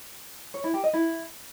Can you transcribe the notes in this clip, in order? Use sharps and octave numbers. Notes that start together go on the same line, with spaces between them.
C#5
E4
G4
D#5
E4